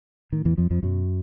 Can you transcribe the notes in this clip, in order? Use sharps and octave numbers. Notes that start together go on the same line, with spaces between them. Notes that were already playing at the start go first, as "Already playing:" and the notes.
A2 D#3
E2 E3
F2 F3
F2 F3
F#2 B2 F#3